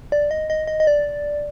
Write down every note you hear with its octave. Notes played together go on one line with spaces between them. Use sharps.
D5
D#5
D#5
D#5
D#5
D5